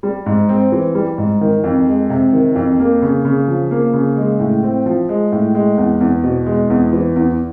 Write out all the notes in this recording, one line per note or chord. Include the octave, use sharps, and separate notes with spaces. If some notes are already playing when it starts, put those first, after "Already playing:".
G3
G#2
C4
E3
G3
G#2
D#3
F2
G#3
C3
D#3
F2
A#3
C#3
C#3
F3
A#3
C#3
G#3
A2
C4
F3
G#3
A2
G#3
E2
E2
B2
G#3
E2
E3
E2